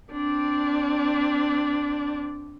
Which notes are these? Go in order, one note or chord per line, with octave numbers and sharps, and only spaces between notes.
C4 D4